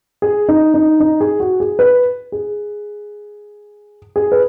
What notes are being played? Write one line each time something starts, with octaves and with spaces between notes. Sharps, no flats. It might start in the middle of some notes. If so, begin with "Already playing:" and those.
G#4
D#4
D#4
D#4
G#4
F#4
G#4
B4
G#4
G#4
B4